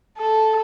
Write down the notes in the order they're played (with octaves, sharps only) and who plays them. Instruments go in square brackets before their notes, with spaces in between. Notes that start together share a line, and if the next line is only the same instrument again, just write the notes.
[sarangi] A4